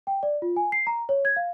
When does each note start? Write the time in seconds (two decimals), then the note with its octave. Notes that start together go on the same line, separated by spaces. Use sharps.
0.07 G5
0.23 D5
0.42 F4
0.56 G#5
0.72 C7
0.87 A#5
1.09 C#5
1.25 G#6
1.36 F5